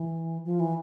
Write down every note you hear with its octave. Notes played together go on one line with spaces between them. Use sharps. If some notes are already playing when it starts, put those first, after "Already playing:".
Already playing: E3
F3
E3